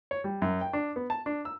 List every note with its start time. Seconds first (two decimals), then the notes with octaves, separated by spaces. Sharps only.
0.11 C#5
0.24 G3
0.42 F#2
0.61 G5
0.73 D4
0.96 B3
1.10 A5
1.26 D4
1.45 E6